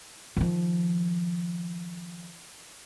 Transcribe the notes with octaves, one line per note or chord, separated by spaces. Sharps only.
D#3 F3